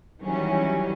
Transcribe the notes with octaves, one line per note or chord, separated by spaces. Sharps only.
D#3 E3 F#3 G3 C#4